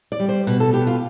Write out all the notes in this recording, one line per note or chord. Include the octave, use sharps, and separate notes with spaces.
D5
G3
C5
B2 B4
A4
B2 G4
F4